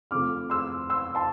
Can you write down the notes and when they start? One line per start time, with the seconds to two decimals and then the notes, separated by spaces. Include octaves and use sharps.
0.11 C3 F3 A3 D6 F6
0.50 C6 E6
0.90 C6 E6
1.15 A5 C6